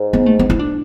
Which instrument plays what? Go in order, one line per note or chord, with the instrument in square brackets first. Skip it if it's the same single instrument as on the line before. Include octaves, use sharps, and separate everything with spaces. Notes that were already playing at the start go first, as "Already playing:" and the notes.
Already playing: [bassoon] G#2
[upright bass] B3
A3
B3
E4
D4